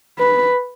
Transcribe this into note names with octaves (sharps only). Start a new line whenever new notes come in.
B4